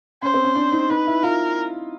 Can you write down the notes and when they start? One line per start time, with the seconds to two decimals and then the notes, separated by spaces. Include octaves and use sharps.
0.22 C#4 C5
0.34 C4
0.44 C#4
0.56 D4
0.72 D#4
0.90 D#4 B4
1.07 E4
1.23 F4 A#4